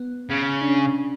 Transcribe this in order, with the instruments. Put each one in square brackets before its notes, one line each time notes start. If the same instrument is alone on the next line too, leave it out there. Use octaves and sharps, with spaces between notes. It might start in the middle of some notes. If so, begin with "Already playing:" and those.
Already playing: [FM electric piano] B3
[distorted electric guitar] C#3
[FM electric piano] D4
C#4